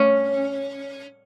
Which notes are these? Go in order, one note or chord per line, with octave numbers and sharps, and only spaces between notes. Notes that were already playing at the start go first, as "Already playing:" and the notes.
Already playing: C#4